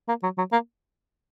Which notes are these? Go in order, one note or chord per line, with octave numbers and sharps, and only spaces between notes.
A#3
F#3
F#3
A#3